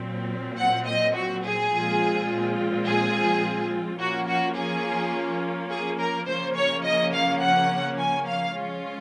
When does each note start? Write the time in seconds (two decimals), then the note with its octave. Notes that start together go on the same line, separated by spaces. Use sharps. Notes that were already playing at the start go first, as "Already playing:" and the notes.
Already playing: A#2 F#3 C4
0.58 F#5
0.86 D#5
1.14 F#4
1.44 G#4
1.72 A#2 F3 G#3 C4 F4
2.85 G#4
4.00 F3 A#3 C#4 F4 F#4
4.28 F#4
4.57 G#4
5.70 G#4
5.99 A#4
6.27 C#3 F3 A#3 C#4 C5
6.56 C#5
6.85 D#5
7.13 F5
7.42 F#5
7.98 G#5
8.27 F5
8.55 F3 G#3 C#4 F4